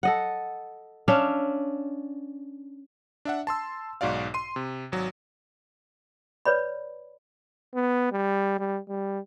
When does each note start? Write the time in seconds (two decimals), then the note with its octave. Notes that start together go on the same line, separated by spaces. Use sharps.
0.03 A4 D#5 F#5
1.08 C#4 D4 E5 F5
3.25 D4 E5 F#5
3.47 A5 C6 E6
4.01 B1 G#2 F#4 D5 F5
4.34 C6 D#7
4.56 C3
4.92 G#1 F#3
6.46 B4 C#5 D5 B5
7.75 B3
8.12 G3
8.59 G3
8.89 G3